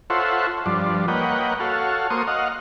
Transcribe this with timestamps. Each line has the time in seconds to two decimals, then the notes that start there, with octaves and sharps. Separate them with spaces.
0.10 F4 A4 C5 C#5 E5 F#5
0.66 G2 F3 D4
1.08 A#3 B4 C#5 D#5 F#5 G5
1.60 F#4 A4 C#5 F5
2.10 A#3 C5 C#6 D#6
2.27 D#5 F5 F#5